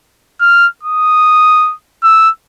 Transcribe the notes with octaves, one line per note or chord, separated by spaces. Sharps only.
F6
D#6
E6